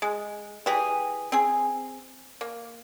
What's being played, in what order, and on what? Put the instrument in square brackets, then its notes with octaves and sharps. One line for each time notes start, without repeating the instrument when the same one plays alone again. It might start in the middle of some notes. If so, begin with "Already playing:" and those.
[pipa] G#3
E3 G4 G#4
C4 G#4
A#3